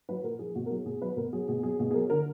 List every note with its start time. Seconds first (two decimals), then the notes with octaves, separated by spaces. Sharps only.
0.09 F#3 B4
0.23 A#2 A#4
0.39 F3 G#4
0.55 B2 F#4
0.66 A#4
0.70 F#3 G#4
0.85 B2 G#4
1.02 F#3 B4
1.17 B2 A#4
1.33 F#3 G#4
1.48 B2 G#4
1.63 F#3 G#4
1.79 B2 G#4
1.91 G#4
1.94 F#3 A#4
2.10 D3 A#4